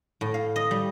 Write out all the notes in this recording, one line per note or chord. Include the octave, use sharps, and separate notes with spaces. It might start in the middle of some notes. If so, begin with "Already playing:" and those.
A2
F5
D#5
G3